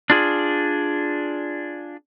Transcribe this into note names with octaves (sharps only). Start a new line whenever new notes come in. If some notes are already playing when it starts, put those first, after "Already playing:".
D4 F4 G#4